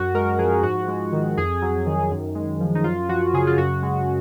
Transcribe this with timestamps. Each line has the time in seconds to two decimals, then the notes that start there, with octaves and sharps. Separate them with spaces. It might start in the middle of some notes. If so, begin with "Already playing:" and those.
Already playing: F#2 F#4
0.14 G#3 A#4
0.39 F3 G#4
0.63 G#2 F#4
0.88 G#3
1.12 D#3
1.37 F2 G#4
1.62 F#3
1.86 D#3
2.11 F#2
2.35 G#3
2.60 F3
2.75 D#4
2.84 F#2 F4
3.09 F3 F#4
3.33 C#3 G#4
3.47 F4
3.58 F#2 F#4
3.83 G#3